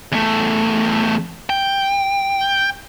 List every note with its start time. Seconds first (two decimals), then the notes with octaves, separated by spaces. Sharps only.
0.12 E2 A3
1.50 G5